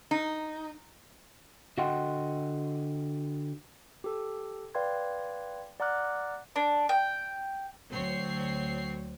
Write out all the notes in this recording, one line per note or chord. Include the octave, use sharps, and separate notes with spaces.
D#4
D3 F#4 D#5 F#5 G5 C6
G4 A4
B4 D5 F5 G5 C6 G#6
D5 F#5 A#5 D6 F6 F#6
D4
G5
D2 F#3 C4 C#5 C7